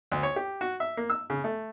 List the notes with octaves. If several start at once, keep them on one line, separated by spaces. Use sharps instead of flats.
D2
C#5
G4
F#4
E5
A#3
E6
C#3
A3